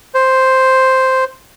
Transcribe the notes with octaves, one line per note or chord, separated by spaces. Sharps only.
C5